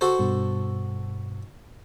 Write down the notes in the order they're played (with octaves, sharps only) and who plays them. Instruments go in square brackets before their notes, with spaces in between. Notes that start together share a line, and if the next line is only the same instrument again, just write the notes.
[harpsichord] F#4 A4 C5
[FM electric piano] G2 B2